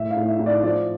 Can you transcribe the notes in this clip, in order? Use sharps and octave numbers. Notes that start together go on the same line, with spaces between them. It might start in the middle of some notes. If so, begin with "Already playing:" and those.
Already playing: A2 E5
F5
A2
E5
A2
D5
F3 D5